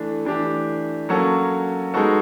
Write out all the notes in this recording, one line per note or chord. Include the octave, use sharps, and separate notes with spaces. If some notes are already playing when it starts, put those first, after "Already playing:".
Already playing: E3 A3 D4
E3 A3 D4 G4
F#3 A#3 C#4 F#4 A4
G#3 B3 D#4 F#4 A4